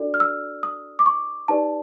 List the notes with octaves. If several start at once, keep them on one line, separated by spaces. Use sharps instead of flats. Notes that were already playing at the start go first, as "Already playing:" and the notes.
Already playing: D4 F#4 A4 D5
F6
E6
D#6
D6
C#6
D#4 G4 B4 D5 A5